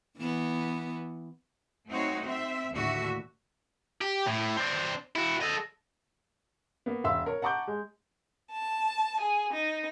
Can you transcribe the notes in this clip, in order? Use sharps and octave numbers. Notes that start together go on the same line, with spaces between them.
E3 B3
A3 C4 D#4 F#4 C#5
C4 E5
D#2 A2 D3 F#4 E5
G4
A2
C4 D4
E4 F#4
A4 D#5
A#3 B3
E1 E5 F5 C6 E6
A#4 C#5
F#5 A5 A#5 C#6 D6 G6
G#3
A5
G#4
D#4